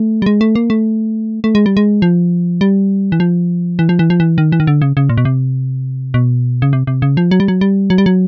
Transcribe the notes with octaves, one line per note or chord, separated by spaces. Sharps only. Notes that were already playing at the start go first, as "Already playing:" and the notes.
Already playing: A3
G3
G#3
A3
A#3
A3
A3
G#3
G3
G#3
F3
G3
E3
F3
E3
F3
E3
F3
E3
D#3
E3
D#3
D3
C#3
C#3
A#2
B2
C3
B2
C#3
C3
C3
C#3
F3
F#3
G3
F#3
G3
F#3
G3
F#3